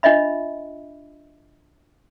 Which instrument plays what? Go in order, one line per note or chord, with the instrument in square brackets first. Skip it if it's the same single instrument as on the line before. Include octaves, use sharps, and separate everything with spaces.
[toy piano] D4 F4 D#5 E5 B5